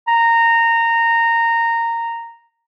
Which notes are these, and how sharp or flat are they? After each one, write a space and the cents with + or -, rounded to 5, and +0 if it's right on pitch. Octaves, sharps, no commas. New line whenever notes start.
A#5 -15